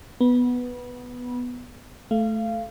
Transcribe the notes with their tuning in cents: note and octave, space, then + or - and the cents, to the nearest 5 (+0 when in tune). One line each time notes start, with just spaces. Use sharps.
B3 +0 B5 -25
A3 -10 F5 -25